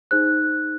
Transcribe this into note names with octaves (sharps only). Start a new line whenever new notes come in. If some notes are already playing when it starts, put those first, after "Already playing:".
D#4 G#4 C5 F#6